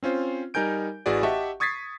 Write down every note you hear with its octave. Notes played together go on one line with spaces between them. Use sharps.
C4 C#4 F4 C5
G3 D#4 A#4 G#5 G6 D7
A1 E3 F#4 G#4 B4 D5
G4 D#5 E5 F#5 A5 C#6
C#6 D#6 G#6 A6 B6 C7